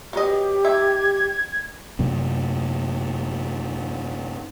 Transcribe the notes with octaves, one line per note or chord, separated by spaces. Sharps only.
F#3 B3 G4 D#5
D#3 E5 G#6
F#2 C3